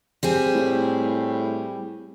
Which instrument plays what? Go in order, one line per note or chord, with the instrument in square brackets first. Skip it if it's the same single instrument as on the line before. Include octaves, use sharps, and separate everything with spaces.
[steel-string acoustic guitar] G3 C4 G#4
[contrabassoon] A2